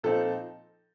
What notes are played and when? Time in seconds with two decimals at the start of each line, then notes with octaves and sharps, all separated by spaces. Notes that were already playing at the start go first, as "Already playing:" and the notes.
0.03 A#2 F3 C4 D#4 A4